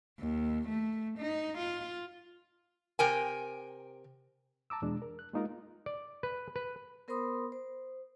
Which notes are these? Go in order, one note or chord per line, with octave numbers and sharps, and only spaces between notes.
D#2
A3
D#4
F4
C3 A#4 G5 G#5
A5 A#5 D6 E6
E2 B2 G#3 D4
A#4
F#6
G#3 A#3 D#4 F4 A#4
D5
B4
B4
B3 A#4 C5 B5 C6 D#6
C5